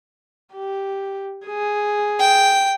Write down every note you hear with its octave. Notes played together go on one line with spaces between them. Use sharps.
G4
G#4
G5